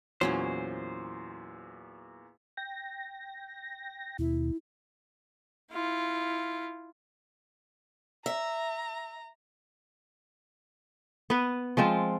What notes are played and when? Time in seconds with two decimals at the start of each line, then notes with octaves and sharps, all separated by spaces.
0.21 E2 A#2 F#3 C#4 E4 C5
2.57 G5 A#6
4.19 D#2 B2 E4
5.72 E4 F4
8.26 E5 A#5
11.30 B3 B4
11.77 F3 G#3 C4 F4